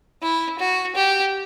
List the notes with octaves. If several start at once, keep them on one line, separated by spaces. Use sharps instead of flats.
E4
F#4
G4